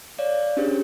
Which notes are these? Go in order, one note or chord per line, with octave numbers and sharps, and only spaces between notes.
C#5 D5 F5
C#4 D4 G4 G#4 C5 C#5